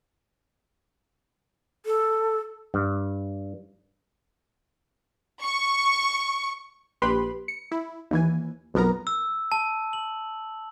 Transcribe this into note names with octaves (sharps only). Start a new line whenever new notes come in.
A4
G2
C#6
A#1 G4 B4 B5 C6
C#7
E4
D#2 E3 G#5
B1 F2 B3 A#4 A#5
E6
A5
F#7